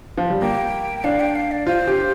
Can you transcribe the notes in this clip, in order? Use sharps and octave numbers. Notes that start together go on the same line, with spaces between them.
F3
G3
A#3 G5
D4 F5
G5
F5
D5
F4 C5
G4